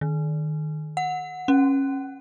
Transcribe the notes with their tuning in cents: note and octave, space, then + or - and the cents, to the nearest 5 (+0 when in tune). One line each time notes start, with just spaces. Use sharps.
D#3 -20
F#5 -15
C#4 -20